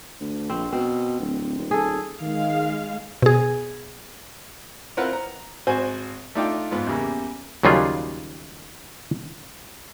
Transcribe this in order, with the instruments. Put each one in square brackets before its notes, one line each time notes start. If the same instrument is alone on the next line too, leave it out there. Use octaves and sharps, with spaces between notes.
[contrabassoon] D2
[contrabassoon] A#1 [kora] C4
[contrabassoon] B2 [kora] C4
[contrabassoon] D1
D#1
[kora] G#4 A4
[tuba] D#3 [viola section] G#3 F5
[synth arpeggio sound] B2 G#4
[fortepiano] C4 E4 F4 A#4 B4 F#5
A#5
G#1 F#4 C5 G#5
A3 D4 D#4 F4 D5 G5
G#2 B3 F4
E2 C#3 G3 A#3
[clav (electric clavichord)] D#2 C#3 F#3 G3 F4 G#4